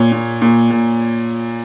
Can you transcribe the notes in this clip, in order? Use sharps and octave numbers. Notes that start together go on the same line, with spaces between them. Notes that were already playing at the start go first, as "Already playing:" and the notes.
Already playing: A#2 C#5
A#2
A#2
A#2